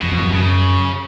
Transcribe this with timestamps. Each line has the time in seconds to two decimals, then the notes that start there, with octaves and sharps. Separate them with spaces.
0.02 F2 B2
0.12 F2
0.22 F#2
0.33 F#2 C#3